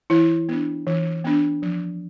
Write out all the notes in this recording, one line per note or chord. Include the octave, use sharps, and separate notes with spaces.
E3 E4
B3 D4
E3
B3 D4
F3